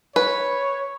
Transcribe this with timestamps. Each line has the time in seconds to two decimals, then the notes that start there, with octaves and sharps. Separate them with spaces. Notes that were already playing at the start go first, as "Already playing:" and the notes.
0.16 B4 C#5